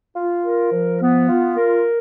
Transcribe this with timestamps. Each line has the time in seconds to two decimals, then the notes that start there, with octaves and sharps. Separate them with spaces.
0.16 F4
0.44 A#4
0.72 F3
1.01 B3
1.29 F4
1.57 A#4